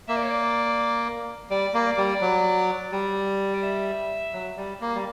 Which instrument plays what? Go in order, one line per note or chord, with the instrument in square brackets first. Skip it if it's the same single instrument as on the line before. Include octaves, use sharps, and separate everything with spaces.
[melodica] A#3 [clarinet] E5
[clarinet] D5
C#5
D5
[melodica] G3 [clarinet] D5
[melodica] A#3
[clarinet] D5
[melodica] G3
F#3
G3
[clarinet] D5
E5
[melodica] F#3
G3
A#3
G3